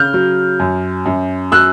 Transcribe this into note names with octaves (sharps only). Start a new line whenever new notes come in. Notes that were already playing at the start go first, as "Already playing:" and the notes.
Already playing: C#3 F6 G6
F#3
F#2
F#2
F#3 E6 F#6